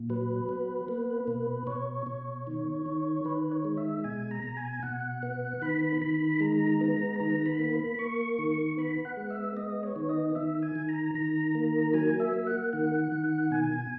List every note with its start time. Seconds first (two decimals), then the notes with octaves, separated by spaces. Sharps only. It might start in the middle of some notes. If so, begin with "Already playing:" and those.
Already playing: A#2
0.10 F#3 B4
0.49 B3
0.88 A#3
1.27 B2
1.67 B2 C#5
2.07 B2
2.47 D#3
2.86 D#3
3.25 D#3 B4
3.51 C#5
3.64 G#3
3.77 E5
4.04 B2 G#5
4.31 A#5
4.43 B2
4.57 G#5
4.83 B2 F#5
5.23 B3
5.62 D#3 B5
6.01 D#3 B5
6.41 G#3 A#5
6.81 B3
7.20 D#3 A#5
7.46 B5
7.59 A#3
7.73 B5
7.99 A#3 C#6
8.39 D#3
8.77 B3 B5
9.05 F#5
9.17 G#3
9.30 E5
9.57 B3 D#5
9.83 C#5
9.96 D#3
10.09 D#5
10.35 D#3 E5
10.63 G#5
10.75 D#3
10.89 A#5
11.14 D#3 A#5
11.55 A#3
11.93 F#3 G#5
12.20 E5
12.33 A#3
12.47 F#5
12.73 D#3 F#5
13.12 D#3
13.51 B2 G#5